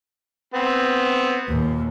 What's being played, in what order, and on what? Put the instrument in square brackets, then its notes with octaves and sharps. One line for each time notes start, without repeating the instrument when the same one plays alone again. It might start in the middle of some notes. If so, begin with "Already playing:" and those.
[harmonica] B3 C4
[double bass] D#2 A#2